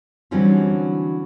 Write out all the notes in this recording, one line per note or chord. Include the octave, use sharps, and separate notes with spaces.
D3 E3 F#3 G3 C4 C#4